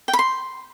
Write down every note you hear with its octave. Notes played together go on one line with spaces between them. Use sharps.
G5
B5
C6